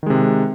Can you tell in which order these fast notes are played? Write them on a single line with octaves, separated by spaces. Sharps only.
D#3 G#3 C3